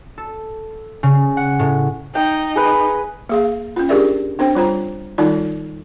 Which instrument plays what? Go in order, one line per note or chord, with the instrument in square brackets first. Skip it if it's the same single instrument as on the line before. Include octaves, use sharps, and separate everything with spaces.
[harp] A4
C#3
F#5
A2
[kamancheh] D#4 [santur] G5
[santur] G#4 B4
[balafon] A#3 G#4 F5
C#4 F4
D4 G4 G#4 A#4 D5 E5
C4 D4 C5 G5
G3 F4 C5 A#5
D#3 G3 D#4 F4 D5